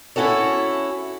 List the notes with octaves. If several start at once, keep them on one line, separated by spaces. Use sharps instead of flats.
C#4 E4 F#4 A4 C#5